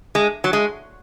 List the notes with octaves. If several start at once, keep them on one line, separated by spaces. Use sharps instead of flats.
G#3
F#3
G#3